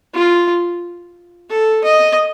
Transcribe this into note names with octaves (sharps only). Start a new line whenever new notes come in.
F4
A4
D#5